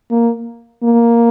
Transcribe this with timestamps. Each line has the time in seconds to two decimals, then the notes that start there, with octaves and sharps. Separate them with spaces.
0.11 A#3
0.83 A#3